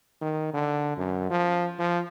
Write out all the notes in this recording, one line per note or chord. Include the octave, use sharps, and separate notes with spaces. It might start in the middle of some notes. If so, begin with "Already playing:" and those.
D#3
D3
F#2
F3
F3